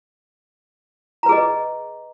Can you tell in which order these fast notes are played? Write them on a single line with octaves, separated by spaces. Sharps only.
A#5 B4 G#4 D#5